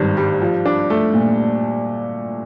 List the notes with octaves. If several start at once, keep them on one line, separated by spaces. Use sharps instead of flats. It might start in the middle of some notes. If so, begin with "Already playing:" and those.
Already playing: G#1 G2 D#3
G3
F3
D4
A3
A#2